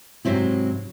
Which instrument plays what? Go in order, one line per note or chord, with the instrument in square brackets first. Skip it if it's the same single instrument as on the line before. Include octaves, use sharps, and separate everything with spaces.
[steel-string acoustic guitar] G#2 C3 F#3 C4 E4